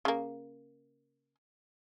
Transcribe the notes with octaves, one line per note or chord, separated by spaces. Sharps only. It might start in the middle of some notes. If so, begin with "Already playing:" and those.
C#3 A#3